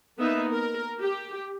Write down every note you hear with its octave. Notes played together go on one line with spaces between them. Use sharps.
A#3 B3 D#4 E5
A#4
G4